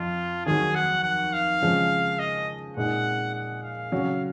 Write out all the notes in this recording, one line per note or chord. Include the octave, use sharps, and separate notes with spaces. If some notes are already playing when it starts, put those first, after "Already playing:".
Already playing: F2 F4
D#2 D#3 F#3 G#4
F#5
F#5
F5
C#3 F3 G#3 C#4
D#5
A#2 G#3 D#4 F#5
F#5
F5
C#3 F#3 C#4